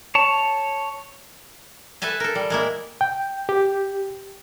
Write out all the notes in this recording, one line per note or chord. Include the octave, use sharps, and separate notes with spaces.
C#5 A5
A4 B4 E5 G#5 A5
A4 A#4
G3
G#3 A#3 E4
G5
G4